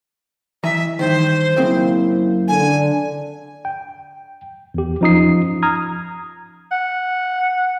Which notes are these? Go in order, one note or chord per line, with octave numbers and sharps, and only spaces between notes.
E3 D#5 E5 A#5
G2 D#3 C5
F#2 C#3 A#3 C4 E4
D3 G#5
G5
E2 G4
F3 C#4 D#4 F4 D#6 C7
A#5 D#6 F6 G#6
F#5